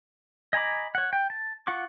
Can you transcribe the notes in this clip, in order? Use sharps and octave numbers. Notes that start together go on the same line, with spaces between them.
D#5 G#5 A#5 B5 D6
C#5 F#5
G5
A5
F4 F#5 C#6 D6